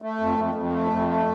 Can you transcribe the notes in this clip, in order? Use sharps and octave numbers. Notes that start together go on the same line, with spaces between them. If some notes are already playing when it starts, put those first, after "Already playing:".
A3
F2
F2
F2
A3
F2
A3